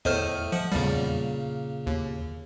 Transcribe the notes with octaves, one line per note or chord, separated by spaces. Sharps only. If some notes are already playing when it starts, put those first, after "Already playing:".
E2 A2 A3 C5 D#5 F6
F3 F#5
E2 A#2 C#3 G3 A#3
D#2